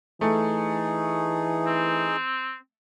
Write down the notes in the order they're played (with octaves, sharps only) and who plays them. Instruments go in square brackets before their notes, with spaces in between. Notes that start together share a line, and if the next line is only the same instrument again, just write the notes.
[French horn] E3 [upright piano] A3 [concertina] D#4 G#4
[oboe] C4